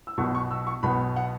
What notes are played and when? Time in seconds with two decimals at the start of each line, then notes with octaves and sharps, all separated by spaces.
0.07 E6
0.18 B1 B2 B3 C#6
0.35 C#6
0.51 E6
0.67 C#6
0.83 B1 B2 B3 B5
1.16 F#5